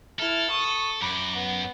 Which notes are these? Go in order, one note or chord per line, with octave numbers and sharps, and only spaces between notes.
E4 A4 F6
C#6 D#6
F#2 B5 D6
B3